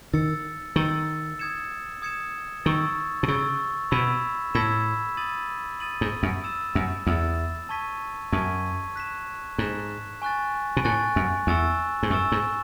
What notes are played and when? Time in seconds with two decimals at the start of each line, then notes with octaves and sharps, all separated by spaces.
0.13 D#3 E6 A6 C#7
0.76 D#3 E6 A6 C#7
1.39 D#6 G#6 C#7 E7
2.02 D#6 G#6 C#7 E7
2.65 D#3 C#6 E6 A6
3.23 B2
3.28 C#3 C#6 E6 A6
3.91 B2 B5 E6 G#6 B6 E7
4.54 A2 B5 E6 G#6 B6 E7
5.17 D#6 A6 D#7 F#7
5.80 D#6 A6 D#7 F#7
6.01 G#2
6.23 F#2
6.44 E6 A6 E7
6.75 F#2
7.07 E2 E6 A6 E7
7.69 A5 C#6 G#6 B6 D#7
8.32 F#2 A5 C#6 G#6 B6 D#7
8.96 F#6 B6 E7
9.58 G#2 F#6 B6 E7
10.22 G#5 C#6 F#6 A6
10.77 B2
10.85 A2 G#5 C#6 F#6 A6
11.16 F#2
11.47 E2 G#5 C#6 E6 A6 E7
12.03 G#2
12.10 F#2 G#5 C#6 E6 A6 E7
12.32 G#2